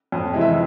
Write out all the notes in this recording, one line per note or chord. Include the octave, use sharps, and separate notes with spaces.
F2
C3 E3 G#3
E5